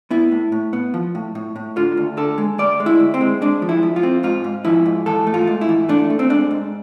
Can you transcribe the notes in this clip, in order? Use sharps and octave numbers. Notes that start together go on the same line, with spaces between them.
B3 E4
A2
A2
B3
F3
A2
A2
A2
D3 F4
D2
D3 A4
G#3
D2 D5
G#3
E4
D2
C4
G#3
G#3 D4
F3
E4
F3
F4
C4
G#2 F4
G#2
F3 E4
G#2
E3 A4
A3
F4
G#2
E4
E3
A3 D4
A3
C4
G#2 D4
G#2